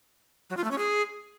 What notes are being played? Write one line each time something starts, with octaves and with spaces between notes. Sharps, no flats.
F#3
F4
A3
C#4
G#4